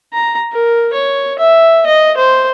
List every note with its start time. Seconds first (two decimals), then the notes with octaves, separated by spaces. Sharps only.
0.13 A#5
0.52 A#4
0.93 C#5
1.38 E5
1.86 D#5
2.17 C5